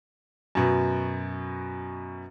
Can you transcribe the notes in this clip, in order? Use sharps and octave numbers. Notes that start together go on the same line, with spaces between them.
F#2 B2